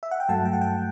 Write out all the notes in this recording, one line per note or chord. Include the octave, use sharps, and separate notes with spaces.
E5
F#5
G5
G2 F#3 A3 A5
G5
F#5
G5